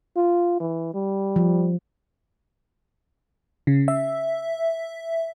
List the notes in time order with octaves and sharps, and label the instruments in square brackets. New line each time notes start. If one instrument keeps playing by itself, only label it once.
[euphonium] F4
E3
G3
[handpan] F3
[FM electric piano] C#3
E5